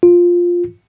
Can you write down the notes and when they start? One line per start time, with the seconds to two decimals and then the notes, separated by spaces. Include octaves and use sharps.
0.03 F4